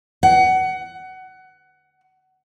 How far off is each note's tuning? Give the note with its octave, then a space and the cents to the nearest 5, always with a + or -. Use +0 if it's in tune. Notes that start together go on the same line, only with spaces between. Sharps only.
F#5 +20